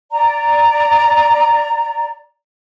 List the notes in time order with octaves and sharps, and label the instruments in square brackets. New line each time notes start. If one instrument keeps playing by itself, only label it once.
[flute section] D5 A#5